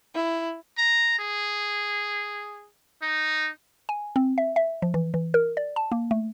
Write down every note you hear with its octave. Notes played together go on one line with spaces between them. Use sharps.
E4
A#5
G#4
D#4
G#5
C4
E5
E5
F3
E3
E3
A#4
D5
A5
A#3
A3